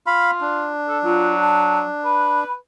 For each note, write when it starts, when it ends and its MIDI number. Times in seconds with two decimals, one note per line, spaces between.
0.07 0.71 65
0.07 0.31 77
0.07 0.31 83
0.41 2.44 62
0.89 0.99 69
1.04 1.87 54
1.04 1.35 65
1.40 1.79 81
2.05 2.55 71
2.05 2.52 83